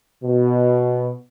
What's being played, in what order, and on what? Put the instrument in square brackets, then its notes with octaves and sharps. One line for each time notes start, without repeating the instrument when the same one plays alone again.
[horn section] B2